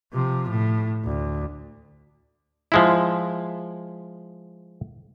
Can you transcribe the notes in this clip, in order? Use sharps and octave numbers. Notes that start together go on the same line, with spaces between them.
C3 F3
A2
D2
F3 G#3 E4